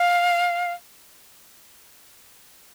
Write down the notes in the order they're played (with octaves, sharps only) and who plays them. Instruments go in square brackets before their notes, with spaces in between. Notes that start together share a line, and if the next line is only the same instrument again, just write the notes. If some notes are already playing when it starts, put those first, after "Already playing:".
Already playing: [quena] F5